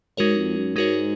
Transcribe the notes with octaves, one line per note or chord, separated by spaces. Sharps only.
G#2 G#3 D#4 F#4 A#4 C#5
F2
F#2
G#2 G#3 D#4 F#4 A#4 C#5